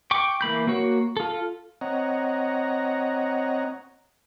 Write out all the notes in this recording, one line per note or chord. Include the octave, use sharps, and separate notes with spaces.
G5 C#6 D6
E3 A#3 B5 G6
A#3 F#4 C#5
F4 A4
C4 C#5 D#5 F#5 A#5